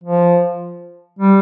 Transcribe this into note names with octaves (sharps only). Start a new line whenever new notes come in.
F3
G3